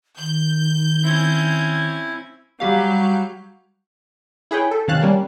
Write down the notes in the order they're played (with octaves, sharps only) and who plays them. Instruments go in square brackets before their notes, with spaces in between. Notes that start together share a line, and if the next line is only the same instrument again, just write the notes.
[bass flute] D#3 [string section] G6
[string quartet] C4 C#4 G#6 [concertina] E4
[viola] F#3 [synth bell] G3 G4 F5
[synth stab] E4 G#4 B4 C#5 G5
A4
C3 D#3 C#4 F5 A5 F#6
G3 A#3 C#4